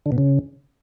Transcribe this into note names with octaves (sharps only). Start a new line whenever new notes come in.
D3
B2
C#3